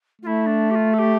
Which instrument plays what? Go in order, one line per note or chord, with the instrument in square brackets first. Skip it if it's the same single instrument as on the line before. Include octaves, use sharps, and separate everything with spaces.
[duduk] A3 [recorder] F4
[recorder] E4
D4
G4
F4
A4
G4